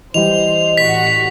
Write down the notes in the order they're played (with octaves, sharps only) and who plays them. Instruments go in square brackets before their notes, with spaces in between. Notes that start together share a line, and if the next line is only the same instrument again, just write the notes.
[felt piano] E3 G3 [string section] C5 [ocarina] D#5 [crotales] F7
[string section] A1 F#4 [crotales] B6